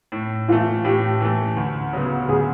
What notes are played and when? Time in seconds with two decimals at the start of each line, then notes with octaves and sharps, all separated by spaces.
0.12 A2
0.48 E3 A3 F4
0.84 A2 G4
1.21 E3 A3
1.57 D2
1.93 C#3 F#3 B3
2.29 D2 G#4